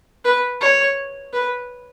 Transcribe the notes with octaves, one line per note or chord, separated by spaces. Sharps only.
B4
C#5
B4